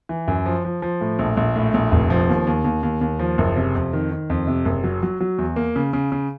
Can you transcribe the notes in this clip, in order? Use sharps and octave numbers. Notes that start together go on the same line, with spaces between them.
E3
F#2
F3
F3
F3
A2
A#1
A#1
A2
A#1
F1
F3
D#2
D#2
D#2
D#2
D#2
F3
F#1
C3
F2
D#3
D#3
F2
C3
F#1
F#3
F#3
F#3
E2
A#3
C#3
C#3
C#3